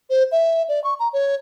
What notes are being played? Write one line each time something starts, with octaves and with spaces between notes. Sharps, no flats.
C5
E5
D5
C#6
A#5
C#5